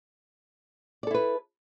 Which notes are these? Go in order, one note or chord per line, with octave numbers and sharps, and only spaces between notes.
E4 A4 B4 D5